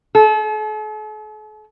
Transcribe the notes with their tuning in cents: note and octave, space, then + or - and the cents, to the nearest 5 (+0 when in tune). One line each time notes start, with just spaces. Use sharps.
A4 -45